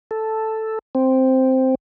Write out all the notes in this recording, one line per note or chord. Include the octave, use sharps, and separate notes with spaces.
A4
C4